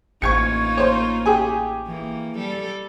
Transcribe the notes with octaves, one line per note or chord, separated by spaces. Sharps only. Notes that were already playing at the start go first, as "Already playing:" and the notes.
A1 A#3 D#4 F4 C#6 G#6 C#7
C5 C#5
G4 G#4 G#5
E3 A#3
G3 A4